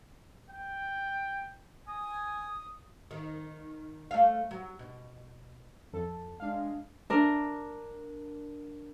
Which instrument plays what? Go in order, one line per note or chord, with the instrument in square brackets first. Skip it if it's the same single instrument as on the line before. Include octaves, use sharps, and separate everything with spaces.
[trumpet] G5
[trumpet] G#5 [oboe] D#6
[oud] D#3
A3 F5
F#3
B2
[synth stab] F2 A4
[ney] G#3 [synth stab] D4 F5
[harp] D4 A#4